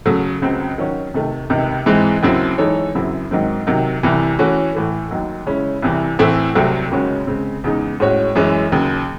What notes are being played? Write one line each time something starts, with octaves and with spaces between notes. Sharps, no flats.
C#3 F#3 A3
C#2 C#3 F#3 C4
D#3 F#3 C#4 F#4 C#5
C3 D#3 A3
C#2 C3 D#3
G#2 E3 G#3 C4
D#2 C#3 F#3 C4 E4
E3 G#3 D#4 A4 C#5
F#2 C#3 F#3 C4 E4
G#2 D#3 F#3 C4
C3 D#3 F#3
C2 C3 E3
E3 A3 C#4 F#4
A2 E3 A3
D#2 D#3 F#3
C#3 G#3 C#4 E4
C2 C3 E3
A2 E3 A3 C4 E4
C2 C3 F#3 A3 C4
D#2 C#3 G#3 C#4 F#4
C#3 G#3 C4
E2 C#3 G#3 D#4
A2 G#3 C#4 F#4 C#5
F#2 E3 G#3 C#4
D#2 C#3 F#3